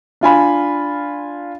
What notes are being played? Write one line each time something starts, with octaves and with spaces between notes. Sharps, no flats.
D4 F4 G#5 B5